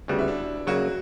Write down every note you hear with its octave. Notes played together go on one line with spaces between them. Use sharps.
D2 C#3 G3 B3 F#4
E4
D4
C#3 F#3 A#3 F#4